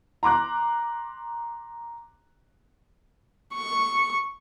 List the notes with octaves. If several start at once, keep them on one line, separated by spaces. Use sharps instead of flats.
A#5 C6 D6 F#6
C#6